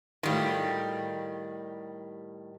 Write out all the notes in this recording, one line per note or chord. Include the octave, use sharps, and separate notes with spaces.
A2 D#3 G3 F4 F#4